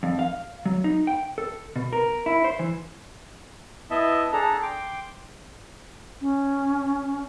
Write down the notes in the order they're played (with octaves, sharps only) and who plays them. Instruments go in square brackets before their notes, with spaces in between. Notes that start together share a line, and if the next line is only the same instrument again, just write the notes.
[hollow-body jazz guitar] F2
F5
F#3
D#4
G5
A4
B2
A#4
E4
C5
E3
[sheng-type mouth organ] B3 E4 D#5 E5 A5
D4 G#4 A4 A5 A#5
G5 C6 D6
[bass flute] C#4